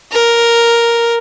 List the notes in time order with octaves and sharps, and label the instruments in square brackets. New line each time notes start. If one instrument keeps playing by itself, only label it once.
[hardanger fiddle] A#4